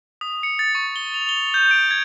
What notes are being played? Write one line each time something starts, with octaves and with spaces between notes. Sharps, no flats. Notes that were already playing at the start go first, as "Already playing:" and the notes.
D#6
C#7
A6
C#6
G7
F7
G7
G6
D7
G#6